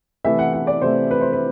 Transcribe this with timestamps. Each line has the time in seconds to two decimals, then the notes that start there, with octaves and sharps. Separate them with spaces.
0.25 C3 E3 A3 E5
0.39 F#5
0.53 F#5
0.67 D5
0.81 C3 E3 A3 C5
1.11 B4
1.21 C5
1.33 B4